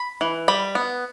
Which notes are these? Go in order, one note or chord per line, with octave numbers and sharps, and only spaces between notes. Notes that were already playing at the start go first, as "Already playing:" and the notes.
Already playing: B5
E3
G3 B5
B3